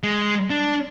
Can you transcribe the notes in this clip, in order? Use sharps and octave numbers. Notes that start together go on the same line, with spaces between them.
G#3
D4